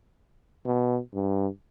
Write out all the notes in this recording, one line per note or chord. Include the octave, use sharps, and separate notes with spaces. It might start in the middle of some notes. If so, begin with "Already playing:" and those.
B2
G2